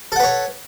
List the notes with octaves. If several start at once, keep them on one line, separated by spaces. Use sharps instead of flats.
A4 B4 C#5 F#5